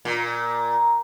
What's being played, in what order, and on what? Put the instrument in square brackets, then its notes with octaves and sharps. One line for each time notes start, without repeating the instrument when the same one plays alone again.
[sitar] A#2